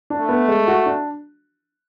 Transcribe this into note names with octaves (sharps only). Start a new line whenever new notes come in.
D4
A3
B3
G#3
F#4
D4